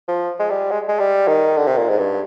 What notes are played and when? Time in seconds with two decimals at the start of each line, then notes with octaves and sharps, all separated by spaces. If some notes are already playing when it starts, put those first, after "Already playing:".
0.08 F3
0.39 G#3
0.50 G3
0.71 G#3
0.88 G#3
1.00 G3
1.28 D#3
1.57 D3
1.67 C3
1.77 A#2
1.89 G#2
1.98 G2